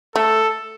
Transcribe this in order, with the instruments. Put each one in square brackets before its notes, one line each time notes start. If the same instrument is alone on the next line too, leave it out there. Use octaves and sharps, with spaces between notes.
[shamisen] A3 [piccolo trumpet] A4